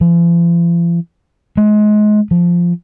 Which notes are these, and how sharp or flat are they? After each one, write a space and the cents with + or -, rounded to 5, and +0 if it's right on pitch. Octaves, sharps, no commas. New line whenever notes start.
F3 -45
G#3 +25
F3 -5